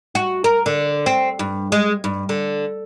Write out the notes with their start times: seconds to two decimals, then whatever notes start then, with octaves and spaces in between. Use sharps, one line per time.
0.15 F#4
0.44 A#4
0.66 D3
1.06 C4
1.39 G2
1.72 G#3
2.04 G2
2.29 D3